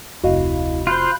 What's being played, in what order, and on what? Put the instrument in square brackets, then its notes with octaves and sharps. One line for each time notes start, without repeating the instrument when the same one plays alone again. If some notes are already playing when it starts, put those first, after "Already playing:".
[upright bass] F1 [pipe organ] D2 E4 [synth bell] F#4 D#5 F5
[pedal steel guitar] F4 C5 [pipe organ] B5 F#6 G6